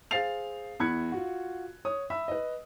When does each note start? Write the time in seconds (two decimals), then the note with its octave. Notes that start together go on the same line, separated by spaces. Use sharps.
0.11 G#4 C5 F5 A6 C7 F7
0.80 E2 E4 B5 F#6 G#6 C#7
1.12 F4 F#4
1.85 C#5 D#6
2.10 E5 B5 E6
2.28 B4 D#5